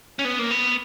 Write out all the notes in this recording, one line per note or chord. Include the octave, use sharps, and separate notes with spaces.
C#4
B3
A#3
B3